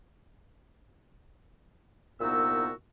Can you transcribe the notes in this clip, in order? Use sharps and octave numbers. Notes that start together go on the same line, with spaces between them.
C2 A#2 B3 D#4 F#4 E6